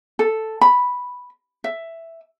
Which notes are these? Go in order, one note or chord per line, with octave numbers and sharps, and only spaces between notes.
A4
B5
E5